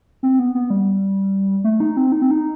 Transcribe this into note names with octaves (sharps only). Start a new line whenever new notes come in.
C4
B3
B3
G3
A3
D#4
C4
D#4
C4
D#4